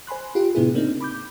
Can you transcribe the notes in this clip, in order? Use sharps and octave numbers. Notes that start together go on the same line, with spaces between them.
C5 G#5 B5 C6 F#6
F4 G4
A2 C3 B3 D4 E4 G#4
C#3 A#3 C4 D4 D#4
B5 D6 G6